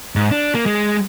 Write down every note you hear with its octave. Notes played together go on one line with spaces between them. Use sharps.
G#2
D4
A#3
G#3